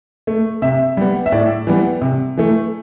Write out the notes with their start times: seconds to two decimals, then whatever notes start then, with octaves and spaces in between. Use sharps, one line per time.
0.27 A3
0.62 C3 E5
0.97 G3 B3
1.26 E5
1.32 A2 D5
1.67 E3 G3 B3
2.01 C3
2.37 E3 A3